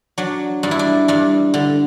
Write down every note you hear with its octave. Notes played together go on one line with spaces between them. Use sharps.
F#3 D4
G2 D4
E4
D4
G2 D4
D3